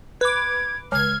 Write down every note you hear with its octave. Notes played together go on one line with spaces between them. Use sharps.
B4 D6 G#6
C#2 F6 G#6